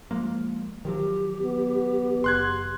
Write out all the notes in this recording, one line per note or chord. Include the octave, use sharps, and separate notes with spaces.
F3 G#3 A#3
D#3 F3 F#3 G4
B3
F#1 C6 F#6 G#6